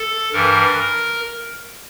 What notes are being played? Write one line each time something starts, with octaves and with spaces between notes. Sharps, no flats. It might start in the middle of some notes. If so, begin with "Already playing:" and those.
Already playing: A4
G2 E3 A#4
A#4